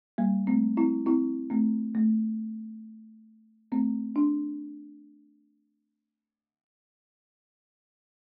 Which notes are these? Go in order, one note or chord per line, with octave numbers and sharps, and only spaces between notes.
G3 A#3
A3 C4
C4 E4
C4 E4
A3 C4
A3
A3 C4
D4